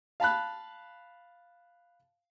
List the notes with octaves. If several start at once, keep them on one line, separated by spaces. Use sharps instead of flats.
F5 A5 B5 F#6